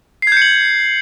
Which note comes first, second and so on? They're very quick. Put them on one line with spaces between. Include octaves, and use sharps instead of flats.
C7 G#6 G6 C#7 F#7